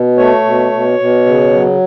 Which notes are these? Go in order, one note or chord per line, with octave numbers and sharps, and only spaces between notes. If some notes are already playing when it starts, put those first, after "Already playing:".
Already playing: B2
A3 C#5
B2
B2
B2
C#3
F#3